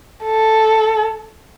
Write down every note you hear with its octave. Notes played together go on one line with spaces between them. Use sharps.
A4